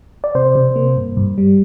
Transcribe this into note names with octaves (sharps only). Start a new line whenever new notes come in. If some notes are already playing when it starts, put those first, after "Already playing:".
D5
C3 C5
C3
A#3
G2
G2
G3